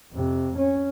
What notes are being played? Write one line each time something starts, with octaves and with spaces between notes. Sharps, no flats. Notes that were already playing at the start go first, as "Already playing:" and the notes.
F2 C3
C#4